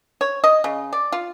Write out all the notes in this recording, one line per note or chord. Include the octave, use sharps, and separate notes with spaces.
C#5
D#5
C#3
D5
F4